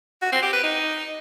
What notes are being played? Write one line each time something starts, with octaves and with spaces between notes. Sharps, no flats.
F#4
C4
G4
B4
D#4